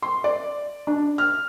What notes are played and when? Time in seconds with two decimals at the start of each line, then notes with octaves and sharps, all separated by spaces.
0.02 C6
0.24 D5
0.87 D4
1.18 F6